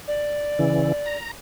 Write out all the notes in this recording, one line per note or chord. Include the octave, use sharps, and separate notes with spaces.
D5
C#3 E3
A#5